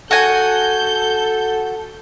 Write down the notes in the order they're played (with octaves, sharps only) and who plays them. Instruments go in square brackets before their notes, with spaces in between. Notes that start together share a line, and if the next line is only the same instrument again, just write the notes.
[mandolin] F#4 G#5 [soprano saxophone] A4 [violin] G6